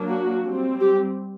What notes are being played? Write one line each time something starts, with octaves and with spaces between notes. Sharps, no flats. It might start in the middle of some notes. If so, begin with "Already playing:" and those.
Already playing: F#3 A#3 D4
F#4
G3 C4
G4